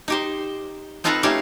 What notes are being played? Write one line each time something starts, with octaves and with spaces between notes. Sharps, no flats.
D#4 G4 C5
C4 D#4 F4 A4 B4 A#5
A3 C#4 D#4 G4 F5